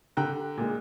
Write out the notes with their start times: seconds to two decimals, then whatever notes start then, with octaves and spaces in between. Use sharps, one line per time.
0.17 D3 G4 G5 A#5 F#6
0.57 A#2 G#3